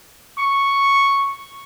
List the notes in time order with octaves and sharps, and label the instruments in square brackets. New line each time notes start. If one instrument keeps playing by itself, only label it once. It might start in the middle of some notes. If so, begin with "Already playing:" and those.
[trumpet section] C#6